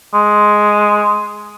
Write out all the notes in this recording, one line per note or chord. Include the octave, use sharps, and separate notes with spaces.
G#3